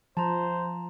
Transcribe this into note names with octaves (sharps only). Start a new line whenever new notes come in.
F3 C5 A5 A#5